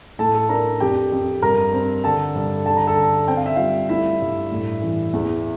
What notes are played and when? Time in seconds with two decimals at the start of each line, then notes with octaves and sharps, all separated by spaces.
0.19 A2 A4 A5
0.34 A4 A5
0.49 D4 A#4 A#5
0.80 F2 G4 G5
1.12 F2
1.42 G2 A#4 A#5
1.73 C4
2.04 D3 A4 A5
2.35 G2
2.65 D3 A5
2.77 A#5
2.87 A4 A5
2.97 D3
3.28 C4 G5
3.37 F5
3.46 E5
3.56 G3 F4 F5
3.89 A3 E4 E5
4.21 G2
4.51 A2
4.82 E3
5.13 E2